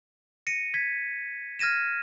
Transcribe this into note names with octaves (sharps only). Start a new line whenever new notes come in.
A#6 C#7 D#7
G#6 B6
F6 G#6 A#6 D#7 E7